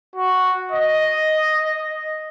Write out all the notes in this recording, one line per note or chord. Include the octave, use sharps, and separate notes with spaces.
F#4
D#5